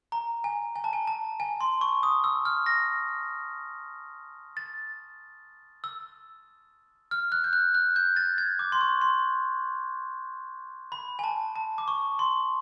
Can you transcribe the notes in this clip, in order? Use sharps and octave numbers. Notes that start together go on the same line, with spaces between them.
A#5
G#5
G#5
A5
G#5
A5
G#5
C6
C#6
D#6
E6
F6
A#6
A6
E6
F6
F#6
G6
F#6
F#6
G6
A6
G#6
D6
C6
C#6
C6
B5
G#5
A5
A5
D6
C#6
C6